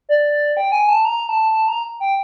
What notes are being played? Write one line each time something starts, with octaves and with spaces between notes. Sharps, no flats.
D5
G5
G#5
A5
A#5
A5
A5
A#5
G5